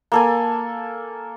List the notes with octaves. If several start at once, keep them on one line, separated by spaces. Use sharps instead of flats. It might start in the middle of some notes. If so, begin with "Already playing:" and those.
A#3 A4 G#5